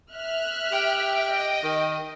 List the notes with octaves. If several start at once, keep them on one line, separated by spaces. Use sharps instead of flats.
E5 F6 F#6
G4 G5
D#5
D#3